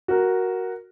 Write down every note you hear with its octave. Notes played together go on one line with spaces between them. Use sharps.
F#4 A#4